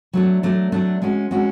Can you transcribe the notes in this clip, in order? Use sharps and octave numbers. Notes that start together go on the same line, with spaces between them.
F#3 A3 D4
F#3 A3 D4
F#3 A3 D4
G#3 C#4 F#4
G#3 C#4 F#4